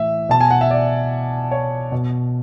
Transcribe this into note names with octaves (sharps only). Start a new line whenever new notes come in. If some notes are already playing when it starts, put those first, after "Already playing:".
Already playing: A2 E3 E5
B2 A5
G#5
F#5
E5
D5
C#5
B2